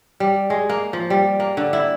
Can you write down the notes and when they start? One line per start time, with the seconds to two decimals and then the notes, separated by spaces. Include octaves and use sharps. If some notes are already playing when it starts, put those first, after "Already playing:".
0.20 G3
0.50 G#3
0.69 A#3
0.93 F3
1.10 G3
1.40 A#3
1.57 D3
1.73 E4